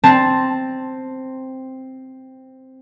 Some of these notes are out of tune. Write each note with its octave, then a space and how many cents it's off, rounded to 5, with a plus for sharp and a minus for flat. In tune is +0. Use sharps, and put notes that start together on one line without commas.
C4 +0 A5 +0